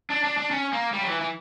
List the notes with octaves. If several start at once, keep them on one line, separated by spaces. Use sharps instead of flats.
D4
D4
D4
C#4
A#3
G3
F#3
E3
E3